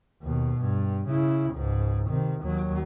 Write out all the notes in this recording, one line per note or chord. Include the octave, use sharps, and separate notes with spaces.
D#2 B2
G2
C#3 E4
C#2 G#2
C3 D#3
D#2 F#3